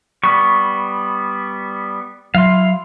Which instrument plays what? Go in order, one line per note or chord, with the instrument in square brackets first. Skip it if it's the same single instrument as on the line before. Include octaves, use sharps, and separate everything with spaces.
[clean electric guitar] G3 B3 [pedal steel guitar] C#6
[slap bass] F#3 [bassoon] E4 [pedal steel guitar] F5 C6